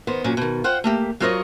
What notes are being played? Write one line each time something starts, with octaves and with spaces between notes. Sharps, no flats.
D#3 B3 C5
A#2 F#3 C#4
B2 D#3
F4 C5 F#5 G5
A3 A#3 G4
F#3 C4 F4 A#4 C#5 D#5